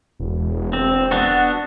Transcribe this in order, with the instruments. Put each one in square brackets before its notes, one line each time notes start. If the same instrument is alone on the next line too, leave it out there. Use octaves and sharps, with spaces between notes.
[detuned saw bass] E1
[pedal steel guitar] C4
B3 D4 F#4